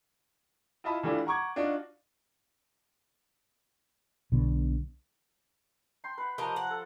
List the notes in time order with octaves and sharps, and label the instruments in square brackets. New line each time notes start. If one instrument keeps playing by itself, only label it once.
[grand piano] E4 F4 D#5 A5 B5
E3 G3 A3 D4 E4 F4
F#5 A#5 C#6 D6 G#6
D4 D#4 F4 F#4
[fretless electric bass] B1 B2 D3
[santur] G5 C6
B4 F#5
[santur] F3 A#5 [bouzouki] G4 A#4 D#5
[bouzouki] F#5
[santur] A4